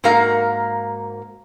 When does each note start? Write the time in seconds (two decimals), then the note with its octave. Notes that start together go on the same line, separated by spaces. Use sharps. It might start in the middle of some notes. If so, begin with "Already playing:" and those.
0.04 G#2 A#3 F#4 A#4 F5 A#5